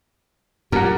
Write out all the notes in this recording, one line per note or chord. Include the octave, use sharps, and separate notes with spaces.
F#2 A#2 G4 A#4 F#5